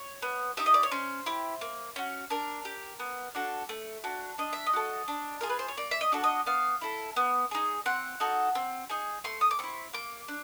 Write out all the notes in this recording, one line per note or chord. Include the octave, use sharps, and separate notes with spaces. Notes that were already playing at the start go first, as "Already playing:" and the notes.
Already playing: C#5
B3
D#4 G4 E5
D#5
D5
C#5
C#4 C5
E4 G4
A#3
C#4 F#4
D4 A#4
G4
B3
D4 F#4 A4
A3
D4 F#4
D4 D#5
E5
D#5
F#4 A4
D4
F4 G#4 A#4
B4
C5
C#5
A#3 D5
E5
D#5
D4 F#4 A4
D#5
B3 F5
E4 A4
B3
D#4 G#4
C4 F#5
D#4 F#4 A4
C4
D#4 G#4
A3 C6
D#6
D6
C4 E4 C#6
A#3 D6
D4